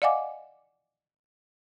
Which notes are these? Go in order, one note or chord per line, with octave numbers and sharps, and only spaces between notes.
D5 D#5 F5 F#5 G#5 D6